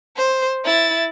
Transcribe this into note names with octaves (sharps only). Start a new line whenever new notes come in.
C5
E4 A6